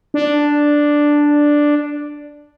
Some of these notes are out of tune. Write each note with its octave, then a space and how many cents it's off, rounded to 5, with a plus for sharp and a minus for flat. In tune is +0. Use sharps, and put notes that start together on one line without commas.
D4 +0